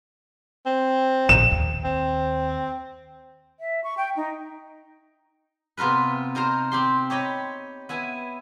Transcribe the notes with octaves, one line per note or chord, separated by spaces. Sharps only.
C4
A#1 E7
D#2
C4
E5
C#6
G5
D#4
C3 B3 F4 A#4 B4
D#4 A#4 C5 A#5
C4 G4 C6
G4 C#5 D#5 B5
B3 E4 G#5